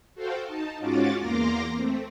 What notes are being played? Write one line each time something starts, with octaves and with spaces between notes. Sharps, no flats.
F#4 A4 C5 F5 G5
D#4 A5
G#2 C#4 F4 F#4 D6 A6
E2 A#3 A#5 C6 D6 A#6
A3 C4